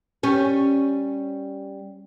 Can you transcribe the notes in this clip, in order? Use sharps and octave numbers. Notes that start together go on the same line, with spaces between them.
G3 C#4